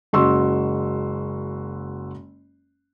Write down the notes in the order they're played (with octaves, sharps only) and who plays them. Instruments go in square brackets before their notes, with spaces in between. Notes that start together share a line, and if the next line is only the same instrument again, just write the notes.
[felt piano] F#1 G#3 F#4 C6 C#6 E6